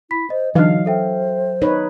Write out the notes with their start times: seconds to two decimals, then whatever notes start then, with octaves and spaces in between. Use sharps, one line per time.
0.11 E4 B5 B6
0.30 C5 D#5
0.55 D3 E3 F#3 D4 D#4 D#5 F5
0.86 A4 C5 E5 G5
1.62 D#4 B4 C#5